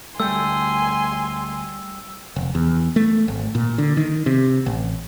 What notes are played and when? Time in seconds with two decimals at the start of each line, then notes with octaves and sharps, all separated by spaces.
0.20 D2 G3 A3 G5 G#5 C6 E6 G6
2.36 F1
2.55 E2
2.96 A3
3.28 G#1
3.55 A#2
3.78 D3
3.97 D#3
4.26 C3
4.66 A1